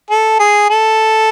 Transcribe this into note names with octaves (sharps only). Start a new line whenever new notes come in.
A4
G#4
A4